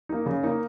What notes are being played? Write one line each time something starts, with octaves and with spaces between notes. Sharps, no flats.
A#3 D#4
C#3
A#3 D#4